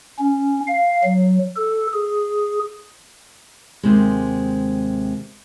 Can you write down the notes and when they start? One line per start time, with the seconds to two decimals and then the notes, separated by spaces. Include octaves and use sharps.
0.19 C#4
0.67 F5
1.04 F#3
1.56 A4
1.93 G#4
3.83 D#2 C3 G#3